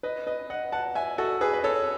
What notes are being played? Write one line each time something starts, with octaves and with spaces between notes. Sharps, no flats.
B4 D#5
B4 D#5
D#5 F#5
F#5 A5
E5 G#5
F#4 A4
G#4 B4
B4
A4 C#5